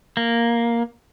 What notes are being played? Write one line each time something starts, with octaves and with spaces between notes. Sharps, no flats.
A#3